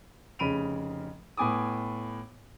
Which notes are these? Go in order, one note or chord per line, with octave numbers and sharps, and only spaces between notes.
F1 C#3 B5 D7 D#7 F7
A2 B3 G#5 D6 D#6